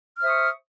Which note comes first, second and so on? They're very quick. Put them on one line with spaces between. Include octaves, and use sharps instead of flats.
F6 C5 E5 D#6 C#6